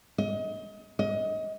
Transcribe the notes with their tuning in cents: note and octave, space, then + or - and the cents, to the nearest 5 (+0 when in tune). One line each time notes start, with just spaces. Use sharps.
D#5 +30
D#5 +25